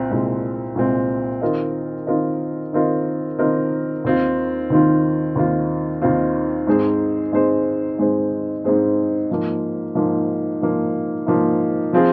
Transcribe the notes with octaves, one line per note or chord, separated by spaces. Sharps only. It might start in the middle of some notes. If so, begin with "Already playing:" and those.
Already playing: C2 A#2 C4
C2 A#2 G#3 C4
C2 A#2 G#3 C4
D#3 C4 F4 A#4 D#5
D#3 C4 F4 A#4 D#5
D#3 C4 F4 A#4 D#5
D#3 C4 F4 A#4 D#5
D#2 D#3 C4 F4
D#2 D#3 C4 F4
D#2 D#3 C4 F4
D#2 D#3 C4 F4
G#2 G#3 C4 G#4 C5
G#2 G#3 C4 G#4 C5
G#2 G#3 C4 G#4 C5
G#2 G#3 C4 G#4 C5
G#2 F3 A#3
G#2 F3 A#3
G#2 F3 A#3
G#2 F3 A#3
F3 C4 F4 G#4